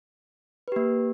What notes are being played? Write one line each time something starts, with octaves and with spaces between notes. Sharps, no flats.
A#3 G4 B4